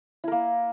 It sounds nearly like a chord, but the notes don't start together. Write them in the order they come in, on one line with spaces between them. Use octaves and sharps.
E4 A#4 A#3